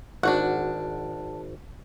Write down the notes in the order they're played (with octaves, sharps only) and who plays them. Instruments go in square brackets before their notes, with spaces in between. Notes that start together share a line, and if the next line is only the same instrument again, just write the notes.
[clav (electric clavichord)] G#1 [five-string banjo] D4 F#4 F#5